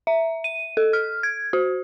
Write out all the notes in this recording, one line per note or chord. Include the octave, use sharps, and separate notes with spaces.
E5
D#7
A4
F6
G#6
F#4